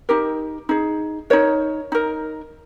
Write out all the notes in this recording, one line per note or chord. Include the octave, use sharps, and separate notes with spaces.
D#4 G4 A#4
D#4 G#4
D#4 A#4 C#5
D#4 A#4